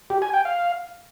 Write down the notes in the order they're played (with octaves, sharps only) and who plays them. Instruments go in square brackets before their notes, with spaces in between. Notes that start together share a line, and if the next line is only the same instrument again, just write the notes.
[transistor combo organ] G4
G#5
G5
F5